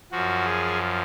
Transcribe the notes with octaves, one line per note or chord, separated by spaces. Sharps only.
F#2 F3 F#4
G#4